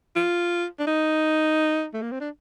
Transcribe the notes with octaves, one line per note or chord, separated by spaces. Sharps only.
F4
D4
D#4
A3
A#3
C4
D4